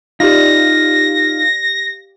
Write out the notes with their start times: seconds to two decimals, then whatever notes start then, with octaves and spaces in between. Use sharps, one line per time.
0.20 D#4 F4 G4 D5 F5 A#6